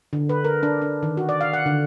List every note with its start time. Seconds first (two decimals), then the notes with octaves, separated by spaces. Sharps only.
0.13 D3
0.29 B4
0.45 A#4
0.63 D4
0.82 D4
1.03 D#3
1.17 F#4
1.29 D5
1.41 F5
1.53 F#5
1.66 D3